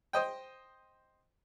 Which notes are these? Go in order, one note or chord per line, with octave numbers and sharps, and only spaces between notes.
C5 D#5 G5